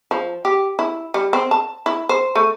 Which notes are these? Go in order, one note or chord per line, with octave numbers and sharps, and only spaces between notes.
F3
G4
E4
G3
C4
A5
E4
C5
A3